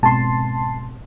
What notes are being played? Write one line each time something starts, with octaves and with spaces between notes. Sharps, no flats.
G#2 B2 C4 A5 C6